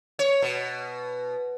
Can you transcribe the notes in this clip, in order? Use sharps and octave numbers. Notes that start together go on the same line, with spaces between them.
C#5
B2